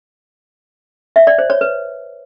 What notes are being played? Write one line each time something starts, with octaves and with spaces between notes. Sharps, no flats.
E5
D5
C5
C#5
B4